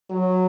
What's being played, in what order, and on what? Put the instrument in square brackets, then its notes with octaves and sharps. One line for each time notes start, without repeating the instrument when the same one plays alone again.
[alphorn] F#3